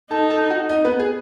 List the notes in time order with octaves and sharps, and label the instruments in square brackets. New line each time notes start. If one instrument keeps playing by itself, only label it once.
[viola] D#4 [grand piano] A4 A5
[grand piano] A4 A5
F#4 F#5
D#4 D#5
B3 B4
G#4